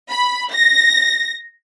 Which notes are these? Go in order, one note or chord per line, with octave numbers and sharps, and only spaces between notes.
B5
A#6